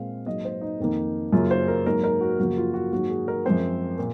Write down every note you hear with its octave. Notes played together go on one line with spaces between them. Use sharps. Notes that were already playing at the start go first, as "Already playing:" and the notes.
Already playing: A#2 G#3 C4 F5
G#2 F#3 A#3 D#5
C5
D#4
F2 D#3 A#3
F#2 C#3 F#3 A#3 F4
C5
A#4
G#2 F#3 A#3 A#4
A#4
F#4
F#2 C#3 F3 A#3 F#4
F4
F#4
G#2 D#3 F#3 A#3 F#4
G#4
A#4
F#2 F3 G#3 C4 C5
A#2